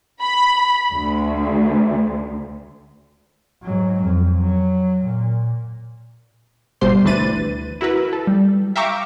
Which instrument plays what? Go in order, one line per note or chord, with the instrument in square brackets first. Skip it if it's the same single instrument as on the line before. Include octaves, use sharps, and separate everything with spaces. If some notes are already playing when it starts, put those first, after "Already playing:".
[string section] B5
D2
[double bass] G#2 F#3
F2
F#3
A#2
[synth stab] G1 B2 G3 G4 C5 C6
D2 E3 D4 B4 A6 D#7
E4 F#4 A#4 B4
A4
G3
E5 F5 G5 A#5 C#6 D6